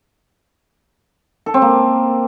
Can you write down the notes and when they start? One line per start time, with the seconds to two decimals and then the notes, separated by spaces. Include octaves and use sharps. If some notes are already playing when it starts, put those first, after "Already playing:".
1.46 A4
1.54 C4
1.62 A#3